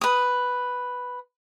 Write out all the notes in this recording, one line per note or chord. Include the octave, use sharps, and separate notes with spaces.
B4 D#6